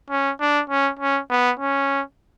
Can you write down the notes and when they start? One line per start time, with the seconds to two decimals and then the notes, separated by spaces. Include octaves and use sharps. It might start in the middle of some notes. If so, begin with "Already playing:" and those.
0.10 C#4
0.41 D4
0.70 C#4
0.99 C#4
1.30 B3
1.59 C#4